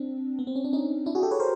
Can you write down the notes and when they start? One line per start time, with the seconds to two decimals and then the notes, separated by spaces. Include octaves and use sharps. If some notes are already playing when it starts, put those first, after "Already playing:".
Already playing: C4 D4
0.39 B3
0.47 C4
0.56 C#4
0.64 D4
0.73 C#4 D#4
1.06 D4 E4
1.15 F#4 G#4
1.23 G4 A4
1.31 B4 C#5
1.40 A#4 C5